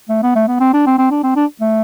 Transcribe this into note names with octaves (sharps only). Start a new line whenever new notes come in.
A3
B3
A3
B3
C4
D4
C4
C4
D4
C4
D4
A3